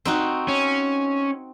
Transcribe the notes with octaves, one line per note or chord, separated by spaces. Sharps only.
C4 D#4 F#4
C#4